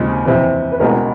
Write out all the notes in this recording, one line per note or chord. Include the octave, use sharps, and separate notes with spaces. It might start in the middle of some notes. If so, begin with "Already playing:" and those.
Already playing: D#2 C#3 F3 G#3 C4
F2 C3 E3
B4
C2 B2 G#3 C#4 A#4